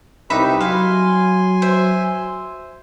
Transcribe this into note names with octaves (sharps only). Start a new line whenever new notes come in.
C2 D#4 G4 B4 E5 B5 C#6
F#3 F5 G#5 C6
C5 E5